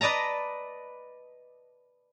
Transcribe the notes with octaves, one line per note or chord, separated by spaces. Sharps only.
B4 D5 D#5 A5 A#5